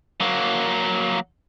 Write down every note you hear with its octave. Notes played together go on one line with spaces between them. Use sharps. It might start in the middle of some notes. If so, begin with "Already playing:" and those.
F#3 A#3